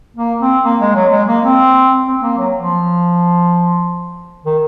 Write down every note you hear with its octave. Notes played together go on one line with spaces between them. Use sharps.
A#3
C4
A#3
G#3
F#3
G#3
A#3
C4
C4
A#3
F#3
F3
D#3